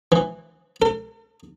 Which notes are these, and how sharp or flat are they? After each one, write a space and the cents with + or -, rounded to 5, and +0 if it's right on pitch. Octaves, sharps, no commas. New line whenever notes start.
E3 +5
A4 +45